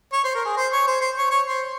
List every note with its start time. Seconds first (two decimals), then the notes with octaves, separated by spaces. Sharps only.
0.13 C#5
0.24 C5
0.35 A#4
0.45 G#4
0.56 C5
0.72 C#5
0.87 C5
1.01 C5
1.17 C#5
1.31 C#5
1.46 C5